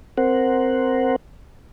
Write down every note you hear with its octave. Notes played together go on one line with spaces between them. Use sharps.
C4 A#4 C5 F#5